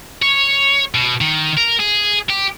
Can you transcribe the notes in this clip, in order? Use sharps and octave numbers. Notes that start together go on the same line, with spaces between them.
C#5
B2
D#3
A#4
G#4
G4